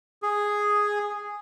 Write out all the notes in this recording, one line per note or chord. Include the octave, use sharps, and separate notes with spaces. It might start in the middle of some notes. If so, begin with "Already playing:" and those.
G#4